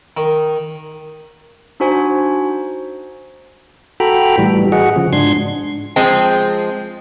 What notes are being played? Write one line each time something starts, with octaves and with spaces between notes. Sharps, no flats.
D#3
D4 D#4 F#4 C5 G#5
F#4 A4 G5 A#5 B5
A2 E3 G3
F#4 G#4 D#5 F#5
C#3 F3
G#2 D4 C6 G#6
F3 G#3 C4